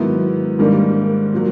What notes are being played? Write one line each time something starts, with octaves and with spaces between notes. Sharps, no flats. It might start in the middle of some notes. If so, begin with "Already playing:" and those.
Already playing: G#2 D#3 F#3 B3 E4
G#2 D#3 G3 A#3 D4
A#2 F#3